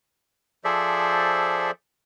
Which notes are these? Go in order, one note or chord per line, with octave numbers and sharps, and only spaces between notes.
F3 G#4 A4 C5 D5 E5